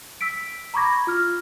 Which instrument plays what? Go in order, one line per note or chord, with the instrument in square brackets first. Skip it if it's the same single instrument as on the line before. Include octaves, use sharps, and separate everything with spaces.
[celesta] E6 B6 D7
A#5 B5 C#6 D6 G#6 A#6
F4 F6